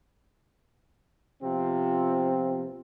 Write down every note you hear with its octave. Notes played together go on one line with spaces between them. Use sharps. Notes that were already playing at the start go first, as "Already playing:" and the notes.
C3 F3 B3 C4 F4